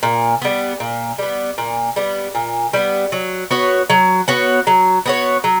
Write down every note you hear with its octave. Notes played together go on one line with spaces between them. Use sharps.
A#2
G3 B3
A#2
G3 B3
A#2
G3 B3
A#2
G3 B3
F#3
B3 F#4 C#5
F#3
B3 F#4 C#5
F#3
B3 F#4 C#5
F#3